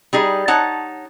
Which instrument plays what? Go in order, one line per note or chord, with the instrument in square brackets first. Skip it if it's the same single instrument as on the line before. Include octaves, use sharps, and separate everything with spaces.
[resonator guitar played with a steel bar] G3 D#4 G#4
D#4 C#5 F#5 A5